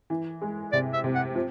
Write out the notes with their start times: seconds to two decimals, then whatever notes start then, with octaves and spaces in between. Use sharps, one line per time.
0.10 E3
0.42 G#3
0.72 C3 D5
0.93 E5
1.04 C3
1.15 F#5
1.35 F3